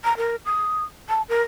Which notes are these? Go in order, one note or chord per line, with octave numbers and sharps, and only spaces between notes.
A#5
A#4
D#6
A5
A#4